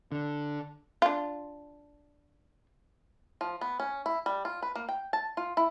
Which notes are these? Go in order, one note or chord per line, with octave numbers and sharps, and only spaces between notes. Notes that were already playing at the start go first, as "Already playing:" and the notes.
D3
D4 F4
F3
B3
C#4
E4
G3
F4
B4
A#3
G5
A5
F4
E4